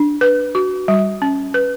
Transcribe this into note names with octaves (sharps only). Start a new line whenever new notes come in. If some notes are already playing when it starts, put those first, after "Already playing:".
Already playing: D4
B4
F#4
G3
C#4
B4